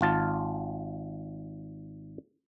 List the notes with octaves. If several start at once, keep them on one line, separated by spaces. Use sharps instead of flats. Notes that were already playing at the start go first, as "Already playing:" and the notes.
G#1 F4 A5